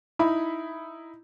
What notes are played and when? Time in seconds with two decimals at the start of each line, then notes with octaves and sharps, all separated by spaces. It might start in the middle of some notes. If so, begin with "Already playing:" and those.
0.19 D#4 E4 B5